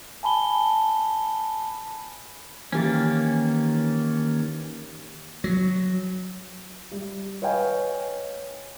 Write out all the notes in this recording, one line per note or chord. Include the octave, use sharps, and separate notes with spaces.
G#5 A5 B5 G7
D#3 E3 A#3 C#4 G4 A6
F#3
G3
B4 C#5 D#5 F5 G5 G#5